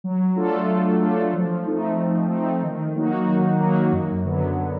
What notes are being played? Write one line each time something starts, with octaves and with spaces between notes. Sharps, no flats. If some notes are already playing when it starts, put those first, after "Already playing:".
F#3
A3 D4 F4 A4
F#3
A3 D4 F4 A4
F3
A3 C4 D#4
F3
A3 C4 D#4
D#3
F#3 A#3 D#4 F#4
D#3
F#3 A#3 D#4 F#4
F#2
D3 F#3 B3